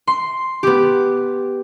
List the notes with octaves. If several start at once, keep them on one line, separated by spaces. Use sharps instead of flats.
C6
B3 G4